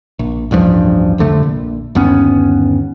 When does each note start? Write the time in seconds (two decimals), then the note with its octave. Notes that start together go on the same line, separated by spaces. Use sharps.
0.19 A#1
0.51 A1 D2 G2 F3
1.18 C2 F2 D3 A3
1.43 A#1
1.95 G1 D#2 B3 C#4